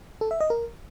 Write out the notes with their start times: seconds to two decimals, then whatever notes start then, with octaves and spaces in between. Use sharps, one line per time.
0.21 A4
0.31 E5
0.41 D#5
0.50 A#4